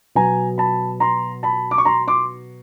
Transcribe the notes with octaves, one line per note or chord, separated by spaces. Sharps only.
B2 F#3 B3 G#5 A#5
A5 B5
A#5 C6
A5 B5
D6
C#6
A#5 C6
C6 D6